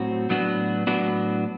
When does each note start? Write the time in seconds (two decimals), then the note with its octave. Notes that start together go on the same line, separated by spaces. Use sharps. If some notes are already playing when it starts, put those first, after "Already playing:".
Already playing: A2 F#3 C4 F#4
0.29 A2 F#3 B3 D4 F#4
0.87 A2 F#3 B3 D4 F#4